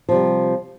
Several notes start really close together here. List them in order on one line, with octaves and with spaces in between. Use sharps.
F3 C3 G3